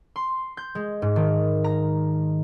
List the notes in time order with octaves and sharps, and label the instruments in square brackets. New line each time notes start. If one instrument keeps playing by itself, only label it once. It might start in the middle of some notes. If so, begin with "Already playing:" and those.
[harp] C6
G6
G#3
G#2
D#3
A#5